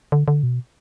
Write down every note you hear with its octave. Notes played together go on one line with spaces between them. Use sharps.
D3
D3
B2